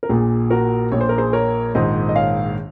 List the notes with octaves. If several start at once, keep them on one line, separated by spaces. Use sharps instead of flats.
A#4
A#1 A#2 G#4
F#4 A#4
A#1 A#2 C#5
C5
A#4
G#4 C5
A#4 C#5
A#1 G#2 D#3 C5 D#5
D#5
C#5 F5